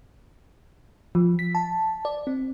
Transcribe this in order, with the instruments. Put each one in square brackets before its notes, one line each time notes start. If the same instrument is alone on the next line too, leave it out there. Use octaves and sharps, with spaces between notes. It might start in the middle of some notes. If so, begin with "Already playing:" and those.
[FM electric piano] F3
B6
A5
D5
C4